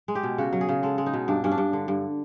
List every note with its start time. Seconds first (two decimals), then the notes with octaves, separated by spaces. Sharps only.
0.08 G#3
0.15 G4
0.23 B2
0.38 C#3 F#4
0.53 F#3
0.61 G#4
0.69 C#3
0.83 G#3 A4
0.98 G#3
1.06 D#4
1.14 B2
1.28 G2 D4
1.44 G2 C#4
1.51 D4
1.58 G2
1.73 D3
1.88 G2